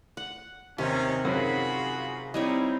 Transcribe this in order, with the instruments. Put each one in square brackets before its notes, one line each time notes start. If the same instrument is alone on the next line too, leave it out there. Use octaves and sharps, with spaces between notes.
[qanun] F#5
[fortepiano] D#2 [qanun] C3 [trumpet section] C#4 D#4
[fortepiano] F#2 D#3 C#4 [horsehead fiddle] F4 G#4 [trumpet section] F#4 B5
[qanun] G3 E4 C#5 [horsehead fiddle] C4 D#4 [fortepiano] D#5